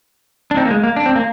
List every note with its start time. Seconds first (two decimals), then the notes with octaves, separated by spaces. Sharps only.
0.51 D4
0.57 C4 D#4
0.65 A#3
0.70 G#3
0.83 A#3
0.96 D4
1.06 C4
1.16 A#3